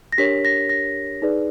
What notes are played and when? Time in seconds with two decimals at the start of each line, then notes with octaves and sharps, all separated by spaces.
0.12 A#6
0.18 D4 G4 A#4 C#5 B6
0.45 A#6
0.69 A#6
1.22 D#4 G#4 B4 D5